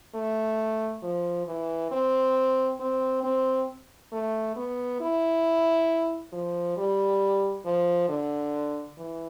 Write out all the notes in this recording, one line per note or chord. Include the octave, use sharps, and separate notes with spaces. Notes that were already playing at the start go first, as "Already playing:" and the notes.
A3
F3
E3
C4
C4
C4
A3
B3
E4
F3
G3
F3
D3
E3